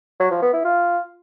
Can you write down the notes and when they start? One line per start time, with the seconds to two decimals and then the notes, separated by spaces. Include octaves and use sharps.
0.20 F#3
0.31 F3
0.42 B3
0.53 E4
0.65 F4